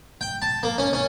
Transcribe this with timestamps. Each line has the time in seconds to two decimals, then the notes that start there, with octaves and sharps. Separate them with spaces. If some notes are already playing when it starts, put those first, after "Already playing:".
0.21 G5
0.42 A5
0.63 A#3
0.78 C#4
0.93 C#4